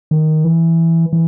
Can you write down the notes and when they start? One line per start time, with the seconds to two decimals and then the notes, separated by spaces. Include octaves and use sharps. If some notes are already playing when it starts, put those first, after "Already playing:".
0.11 D#3
0.44 E3
1.13 E3